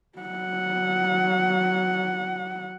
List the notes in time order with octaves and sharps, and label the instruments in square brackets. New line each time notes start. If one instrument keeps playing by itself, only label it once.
[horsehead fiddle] F#3 F#5